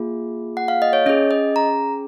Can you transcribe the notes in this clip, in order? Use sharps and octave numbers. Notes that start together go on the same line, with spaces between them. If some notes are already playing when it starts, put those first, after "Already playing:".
Already playing: A#3 F4 G#4
F#5
F5
D#5
C#5
C#4 G#4 D#5
D#5
A#5